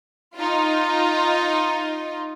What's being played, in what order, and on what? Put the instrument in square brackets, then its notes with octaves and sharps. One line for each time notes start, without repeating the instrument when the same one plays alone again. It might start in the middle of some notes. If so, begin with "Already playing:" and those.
[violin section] D#4 F4